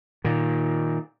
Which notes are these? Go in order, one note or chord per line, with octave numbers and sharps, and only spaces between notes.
A#2 D#3